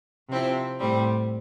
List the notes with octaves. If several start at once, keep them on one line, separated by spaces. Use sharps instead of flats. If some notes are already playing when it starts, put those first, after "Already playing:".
C3 F3 C4 E4
A2 G3 C4